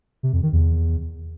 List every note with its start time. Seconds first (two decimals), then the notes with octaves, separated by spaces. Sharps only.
0.23 C3
0.33 F2
0.43 D#3
0.53 E2